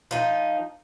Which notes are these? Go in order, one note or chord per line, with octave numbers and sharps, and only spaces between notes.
F3 D#4